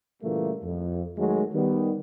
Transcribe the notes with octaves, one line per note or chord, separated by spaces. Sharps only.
A#2 C#3 E3 G3 A3 A#3
F2
D#3 F#3 G#3 A3
D#3 G3 B3